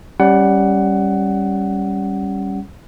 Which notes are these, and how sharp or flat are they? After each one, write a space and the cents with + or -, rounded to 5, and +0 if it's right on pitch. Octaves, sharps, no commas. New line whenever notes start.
G3 +0 C#4 +0 F#5 +15